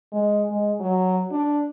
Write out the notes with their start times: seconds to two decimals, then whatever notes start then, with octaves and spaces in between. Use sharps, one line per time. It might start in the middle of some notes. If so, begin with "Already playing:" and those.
0.12 G#3
0.50 G#3
0.80 F#3
1.32 D4